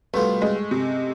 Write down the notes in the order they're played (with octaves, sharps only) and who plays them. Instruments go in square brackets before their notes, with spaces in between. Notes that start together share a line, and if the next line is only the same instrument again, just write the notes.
[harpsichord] C2 B2 B3 F4 [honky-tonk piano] A3
[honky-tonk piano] G#3
C3